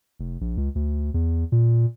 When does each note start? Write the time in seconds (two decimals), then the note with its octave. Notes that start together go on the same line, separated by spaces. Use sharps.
0.19 F1
0.41 A#1
0.57 C#2
0.75 D2
1.14 E2
1.52 A#2